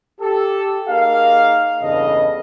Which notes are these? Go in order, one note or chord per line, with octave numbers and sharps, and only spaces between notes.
G4 A4
A#3 D#4 G#4 A#4 F5
E2 G2 C#3 A4 D#5